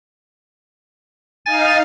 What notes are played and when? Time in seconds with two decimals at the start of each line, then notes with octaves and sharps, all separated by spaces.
1.46 D#4 F5 G#5 A6